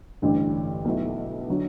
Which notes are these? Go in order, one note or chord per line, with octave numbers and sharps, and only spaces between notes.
A1 G2 D3
B1 B2 A3 E4
D3 F#3